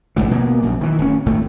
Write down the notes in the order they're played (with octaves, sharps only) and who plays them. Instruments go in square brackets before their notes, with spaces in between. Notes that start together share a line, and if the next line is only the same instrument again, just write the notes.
[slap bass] E1 C#2 G#2 E3
B2 A#3 B3
A#1 F#2
D#3 E3
D1 C#4
G#1 D2 A2 A3